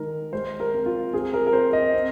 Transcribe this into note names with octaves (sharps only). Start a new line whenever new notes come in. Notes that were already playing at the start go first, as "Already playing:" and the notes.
Already playing: D#3 G#3 A#4
G#3 C5
A#4
C4
F4
C4 G#4
A#4
A#4
C4 C5
D#5
C4